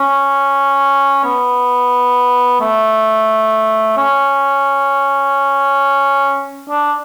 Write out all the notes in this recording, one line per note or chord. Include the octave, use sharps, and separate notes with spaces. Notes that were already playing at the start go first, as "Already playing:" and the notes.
Already playing: C#4
B3
A3
C#4
D4